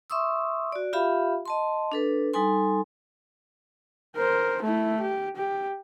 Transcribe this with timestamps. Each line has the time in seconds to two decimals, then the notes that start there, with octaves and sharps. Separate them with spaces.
0.10 E5 C6 C#6 D#6 E6
0.72 F#4 D5
0.93 F4 G4 E5 F5 B5
1.45 D#5 A5 C6
1.92 D4 A4 B4
2.34 G3 D#4 A4 G#5 C6
4.16 A#4 C5
4.62 A3 E4
5.01 G4
5.36 G4